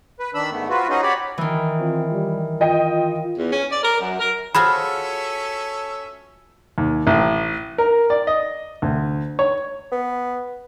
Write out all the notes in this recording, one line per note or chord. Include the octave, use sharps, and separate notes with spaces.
B4
D#3 D4 B5 E6
G#2 A3 B3
C4 F4 F#4 B4
C#4 D#4 F#4 G#4 D#5
F#4 G4 C#5 D5 B5
D#3 E3
C4 F4
G3
F4 D#5 G5
E2
C#4
D5
A#4
F#2
A#4
C#4 F4 F#4 G#4 A4 E5 B5
D#2
A1
A#4
D5
D#5
D2
C#5
B3